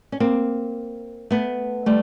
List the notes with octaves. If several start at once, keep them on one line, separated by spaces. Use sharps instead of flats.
C#4
A#3 C4
A3 B3
G3 A3